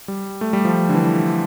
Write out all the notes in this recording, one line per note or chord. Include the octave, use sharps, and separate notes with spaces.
G3
A3
G3
F3
D3
E3